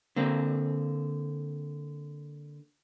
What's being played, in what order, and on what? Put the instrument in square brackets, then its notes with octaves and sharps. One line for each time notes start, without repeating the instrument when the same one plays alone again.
[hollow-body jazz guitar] D3 A#3 C4